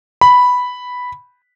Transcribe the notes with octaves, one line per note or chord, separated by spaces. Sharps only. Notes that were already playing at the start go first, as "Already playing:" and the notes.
B5